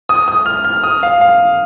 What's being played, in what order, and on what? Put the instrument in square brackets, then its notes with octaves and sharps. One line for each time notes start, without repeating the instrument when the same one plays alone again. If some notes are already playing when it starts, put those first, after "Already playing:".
[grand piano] D#6
D#6
F6
F6
D#6
F5
F5